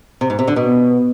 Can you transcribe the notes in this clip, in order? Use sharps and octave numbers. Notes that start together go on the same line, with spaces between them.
C3
G#2
C3
D3
B2